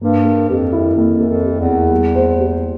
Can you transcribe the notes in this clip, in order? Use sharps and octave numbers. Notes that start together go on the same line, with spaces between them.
G2 A#3
A#4
F2 G4
E4
F2 A#3
A#4
F2
G4
E2
E4
G3
C5
G4